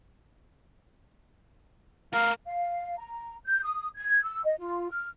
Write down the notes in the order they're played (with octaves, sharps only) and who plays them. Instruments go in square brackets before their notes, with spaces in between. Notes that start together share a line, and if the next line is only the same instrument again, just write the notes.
[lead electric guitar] A3 A#4 [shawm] F5
[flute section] F5
A#5
G6
D#6
G#6
E6
D#5
F4
F6